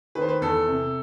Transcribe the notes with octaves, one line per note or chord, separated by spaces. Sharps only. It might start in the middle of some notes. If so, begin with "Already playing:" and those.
D#3 B4
C5
B4
E2 A4
C3